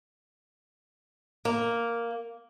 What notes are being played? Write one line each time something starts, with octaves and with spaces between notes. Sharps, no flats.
A#3